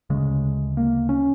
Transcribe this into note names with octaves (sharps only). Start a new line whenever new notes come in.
D2 C#3 G#3
A#3
C#4